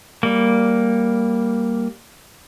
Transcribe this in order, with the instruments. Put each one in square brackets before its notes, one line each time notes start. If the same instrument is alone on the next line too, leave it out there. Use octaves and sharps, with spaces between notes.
[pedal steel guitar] G3 A#3